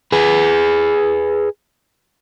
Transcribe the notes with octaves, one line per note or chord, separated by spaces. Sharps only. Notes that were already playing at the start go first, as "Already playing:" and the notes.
G#4 B4